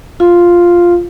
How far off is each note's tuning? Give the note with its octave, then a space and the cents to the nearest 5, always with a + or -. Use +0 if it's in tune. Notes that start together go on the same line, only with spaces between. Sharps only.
F4 +0 F5 +0